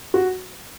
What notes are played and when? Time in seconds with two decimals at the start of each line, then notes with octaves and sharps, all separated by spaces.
0.14 F#4